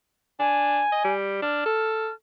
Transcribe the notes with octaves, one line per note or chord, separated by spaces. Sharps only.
D4 G#5
D#5
G3
D4 F6
A4